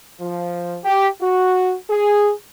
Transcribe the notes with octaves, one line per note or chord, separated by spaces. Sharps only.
F3
G4
F#4
G#4